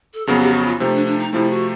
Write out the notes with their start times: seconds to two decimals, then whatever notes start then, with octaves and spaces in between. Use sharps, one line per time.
0.14 A4
0.27 F2 C#3 F#3 B3 G#4
0.40 G4
0.53 F#4
0.66 F4
0.79 C3 F3 A3 D#4
0.93 D4
1.06 D4
1.19 D#4
1.32 C3 F3 A3 E4
1.50 F#4